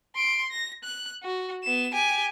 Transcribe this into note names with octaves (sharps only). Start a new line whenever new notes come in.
C6 D7
A#6
F#6
F#4
B3 E7
G4 G#5